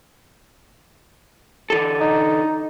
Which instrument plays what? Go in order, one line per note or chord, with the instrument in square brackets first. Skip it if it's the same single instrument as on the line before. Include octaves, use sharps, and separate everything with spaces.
[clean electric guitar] D3 E3 A4
[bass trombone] D#4